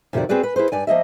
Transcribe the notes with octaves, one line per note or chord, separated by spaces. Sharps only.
F2 C3 D#3 F4 F#4 D5
C4 F#4 G#4 B4 D5
B4
E4 G#4 B4 C5
G2 D5 G#5
F3 A#3 D#5 E5